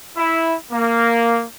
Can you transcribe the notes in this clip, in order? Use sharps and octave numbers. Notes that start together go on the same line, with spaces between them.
E4
A#3